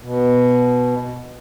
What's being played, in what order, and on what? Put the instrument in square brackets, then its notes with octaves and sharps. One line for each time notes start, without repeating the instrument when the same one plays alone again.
[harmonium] B2